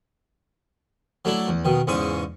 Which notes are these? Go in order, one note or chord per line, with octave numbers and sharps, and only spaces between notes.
F#3 A3 D4 E4
E2
B2 D#3
E2 G#2 C#3 C#6 D#6